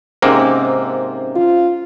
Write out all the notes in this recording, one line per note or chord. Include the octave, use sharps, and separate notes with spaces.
G#2 C3 A#3 C#4 C5
F4